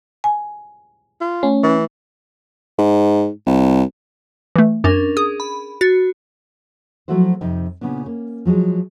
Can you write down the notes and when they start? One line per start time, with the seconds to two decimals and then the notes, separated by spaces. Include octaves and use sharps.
0.24 G#5
1.21 F4
1.43 A3 C#4
1.63 E3
2.79 G#2
3.47 C2
4.56 E3 A3
4.84 F#2 C#4 D4 A#4
5.17 G#4 D#6
5.40 B5
5.81 F#4 A6
7.08 F3 F#3 A3 E4 F#4 C5
7.41 F2 C3 C4 D#4 G5
7.81 A#2 C#3 B3 C#4 D4
8.06 A#3 C#4
8.45 F3 F#3 G#3 G#4